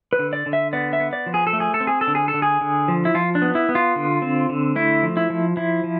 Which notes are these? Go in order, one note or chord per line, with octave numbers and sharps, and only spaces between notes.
B4
D3
D5
D3
E5
B3 D5
E5
B3
D5
F3
G#4
A4
A3
G#4
A4
C4
G#4
A4
D3
G#4
A4
D3
G#4
D3
F3
E4
F3 F4
D4
B3
E4
B3
F4
D3
C4
D3
A3 E4
F3
E4
F3
F3 E4
F3